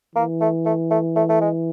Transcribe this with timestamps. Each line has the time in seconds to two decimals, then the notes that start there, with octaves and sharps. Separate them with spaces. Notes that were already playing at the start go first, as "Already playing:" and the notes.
0.16 E3 A#3
0.41 A3
0.66 A3
0.91 A3
1.16 A3
1.29 A3
1.41 G#3